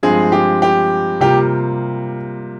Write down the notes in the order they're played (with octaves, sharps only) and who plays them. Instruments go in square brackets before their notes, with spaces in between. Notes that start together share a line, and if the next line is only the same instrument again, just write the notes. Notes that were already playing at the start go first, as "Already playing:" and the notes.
[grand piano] G2 F3 G#3 C4 [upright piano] G#4
[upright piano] G4
G4
[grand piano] C3 G3 A#3 F4 [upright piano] G4